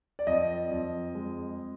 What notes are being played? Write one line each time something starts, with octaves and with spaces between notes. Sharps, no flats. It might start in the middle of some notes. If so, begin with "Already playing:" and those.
D5
F2 D#5
F2
G#3